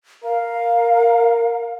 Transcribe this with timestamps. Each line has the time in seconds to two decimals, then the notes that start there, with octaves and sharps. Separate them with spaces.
0.24 A#4 F5